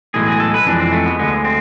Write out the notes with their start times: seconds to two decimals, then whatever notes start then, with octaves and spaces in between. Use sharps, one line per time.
0.14 B1 A2 E3 G#3 G#4
0.28 G#4
0.40 A4
0.54 B4
0.67 F2 E3 G#3 D4
0.80 C4
0.92 A3
1.06 B3
1.19 D2 D3 G#3 B3
1.44 C4